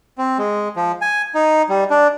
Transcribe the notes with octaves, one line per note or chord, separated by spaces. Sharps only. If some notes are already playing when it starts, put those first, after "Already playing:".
C4
G#3
F3
G#5
D#4
G3
D4